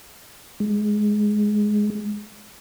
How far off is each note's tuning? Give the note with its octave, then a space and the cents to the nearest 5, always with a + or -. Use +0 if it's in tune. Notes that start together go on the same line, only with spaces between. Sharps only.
G#3 +10